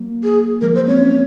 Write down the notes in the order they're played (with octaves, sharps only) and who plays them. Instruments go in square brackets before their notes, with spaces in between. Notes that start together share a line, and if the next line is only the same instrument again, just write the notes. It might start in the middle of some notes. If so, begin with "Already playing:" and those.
Already playing: [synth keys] F#3 A#3
[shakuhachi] G#4
[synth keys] F3 G#3 [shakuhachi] A#4
[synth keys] F#3 A#3 [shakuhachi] C5
[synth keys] G#3 C4 [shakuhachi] C#5
[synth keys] A#3 C#4